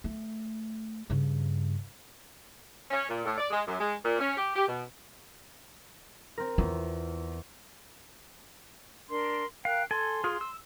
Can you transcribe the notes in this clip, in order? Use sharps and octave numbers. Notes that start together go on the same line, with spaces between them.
A3
G2 C#3
C#4
A#2
A2
D5
G#3
F#2
G#3
A#2
C#4
G4
G4
B2
C4 A#4
E2 F4
D4 A#4 C6
A#4 F5 G5 F#6
A4 G#5 C6
F4 G#4
E6